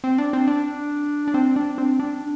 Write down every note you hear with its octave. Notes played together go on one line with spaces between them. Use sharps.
C4
D4
C4
D4
D4
C4
D4
C4
D4